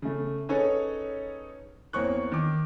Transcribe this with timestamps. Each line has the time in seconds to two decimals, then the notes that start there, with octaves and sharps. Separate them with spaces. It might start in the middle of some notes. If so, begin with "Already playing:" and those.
0.02 C#3 A3
0.49 C#4 D#4 G#4 A4 B4 C#5
1.93 E2 A#3 C4 C#5 C#6 F#6
2.32 D#3 D6